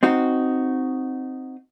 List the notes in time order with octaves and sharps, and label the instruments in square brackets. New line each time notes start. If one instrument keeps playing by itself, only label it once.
[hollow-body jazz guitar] C4 D#4 F#4